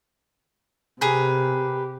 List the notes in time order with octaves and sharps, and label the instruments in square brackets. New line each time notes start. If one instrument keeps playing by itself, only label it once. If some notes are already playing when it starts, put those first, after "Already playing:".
[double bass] C3 [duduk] G4 [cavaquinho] G#4 A#4 B4